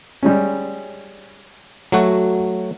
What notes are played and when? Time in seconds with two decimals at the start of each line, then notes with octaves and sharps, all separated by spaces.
0.23 G3 G#3 C#4
1.92 F#3 A3 F#4